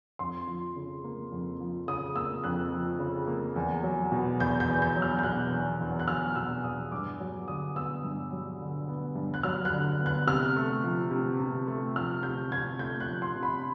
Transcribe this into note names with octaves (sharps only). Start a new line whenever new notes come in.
F2 C6
F3
C#3
A#3
F2
F3
C#3 D#6
A#3 E6
F2 F#6
F3
C#3
A#3
E2
F#3
B2
E2 G6
G6
E2
G6
F#3
F6
G6
B2 F#6
E2
E2
F#6
F#3 F6
B2 E6
E2 D#6
G2 D6
F#3
D3 D#6
B3 E6
G2
F#3
D3
B3
G2
F#6
F#3 F6
F#6
D3
B3
F#6
C3 F6
A3
F3
C3
C3
A3
F3 F6
C3 G6
C3 G#6
A3 G6
F#6
F3
C6
C3
B5